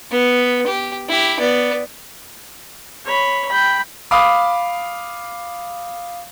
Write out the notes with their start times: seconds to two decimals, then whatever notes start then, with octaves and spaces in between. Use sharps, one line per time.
0.11 B3
0.67 G4
1.09 E4 G4
1.40 B3 D5
3.06 C#5 B5
3.48 G5 B5
4.11 F5 B5 D6 D#6